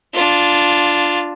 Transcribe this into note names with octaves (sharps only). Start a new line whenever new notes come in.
D4 F4